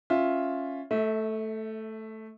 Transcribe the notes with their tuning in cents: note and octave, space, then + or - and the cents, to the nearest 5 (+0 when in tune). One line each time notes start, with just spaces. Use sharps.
C#4 +0 F4 +5 E5 +0
A3 +0 E5 -30